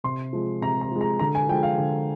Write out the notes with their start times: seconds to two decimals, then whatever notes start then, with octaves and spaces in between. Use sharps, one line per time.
0.04 C3 C6
0.33 F3 G#3
0.62 C3 A#5
0.81 A#5
0.91 F3 G#3
1.01 A#5
1.19 D3 A#5
1.35 G#5
1.49 F3 G#3 G5
1.63 F5
1.78 D3